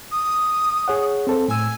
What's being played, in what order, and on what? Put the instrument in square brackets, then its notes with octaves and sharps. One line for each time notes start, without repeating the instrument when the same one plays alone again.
[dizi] D#6
[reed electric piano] G#4 C#5 F#5
C4 A4 C5
[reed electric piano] A2 E6 [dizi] G#5